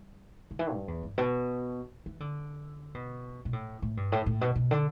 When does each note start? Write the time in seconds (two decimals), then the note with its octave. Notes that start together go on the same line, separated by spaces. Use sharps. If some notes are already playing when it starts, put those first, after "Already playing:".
Already playing: G3
0.51 D3
0.59 E3
0.73 G2
0.88 E2
1.03 G2
1.18 B2
2.06 E3
2.20 D3
2.95 B2
3.45 B2
3.53 A2
3.82 A2
3.97 G2
4.12 A2
4.26 A2
4.41 B2
4.55 B2
4.71 D3